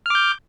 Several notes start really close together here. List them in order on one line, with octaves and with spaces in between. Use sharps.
F6 D6 G6